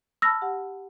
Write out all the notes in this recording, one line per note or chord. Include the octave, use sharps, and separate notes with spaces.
A5 B5 E6 F6 A#6
G4 F#5